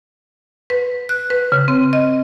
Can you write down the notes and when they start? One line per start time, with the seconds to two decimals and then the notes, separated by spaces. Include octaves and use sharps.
0.70 B4
1.09 F#6
1.30 B4
1.52 C#3
1.68 C4
1.93 D#5